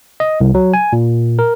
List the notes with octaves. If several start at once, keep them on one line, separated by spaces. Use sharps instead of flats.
D#5
C2
F#3
G#5
A#2
A#4